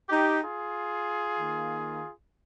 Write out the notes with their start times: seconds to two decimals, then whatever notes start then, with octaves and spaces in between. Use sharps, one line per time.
0.09 D#4 G4
0.41 F4 G#4
1.35 D#3 A#3